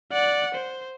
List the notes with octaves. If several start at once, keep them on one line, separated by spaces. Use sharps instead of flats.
D5 F#5
C5